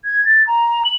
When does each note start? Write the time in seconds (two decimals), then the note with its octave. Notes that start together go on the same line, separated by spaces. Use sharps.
0.04 G#6
0.25 A6
0.47 A#5
0.85 F#7